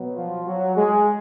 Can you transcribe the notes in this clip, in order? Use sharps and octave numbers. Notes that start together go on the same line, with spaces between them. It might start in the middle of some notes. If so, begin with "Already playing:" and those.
Already playing: B2 F#3 B3
F3 F4
F#3 F#4
G#3 G#4